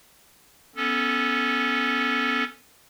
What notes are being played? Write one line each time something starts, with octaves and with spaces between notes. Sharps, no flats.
B3 C#4 A4